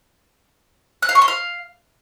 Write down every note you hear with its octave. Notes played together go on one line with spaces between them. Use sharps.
F#6
F5
C#6
C6
F5